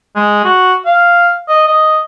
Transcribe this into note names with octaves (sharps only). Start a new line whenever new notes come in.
G#3
F#4
F5
D#5
D#5